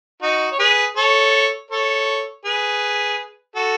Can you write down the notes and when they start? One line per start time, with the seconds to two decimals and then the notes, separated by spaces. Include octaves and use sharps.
0.22 D#4 F#4
0.52 C#5
0.59 G#4 B4
0.96 A4 C#5
1.71 A4 C#5
2.45 G#4 B4
3.56 F#4 A4